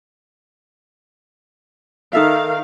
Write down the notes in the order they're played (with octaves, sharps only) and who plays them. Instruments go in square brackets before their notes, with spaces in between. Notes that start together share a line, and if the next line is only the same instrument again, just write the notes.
[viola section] D#3 F5 [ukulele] D#4 A4 E5